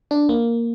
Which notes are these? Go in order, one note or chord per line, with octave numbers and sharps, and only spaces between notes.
D4
A#3